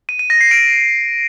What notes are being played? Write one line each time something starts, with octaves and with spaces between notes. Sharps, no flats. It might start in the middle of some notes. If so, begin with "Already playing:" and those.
D#7
D#7
A#6
C7
D7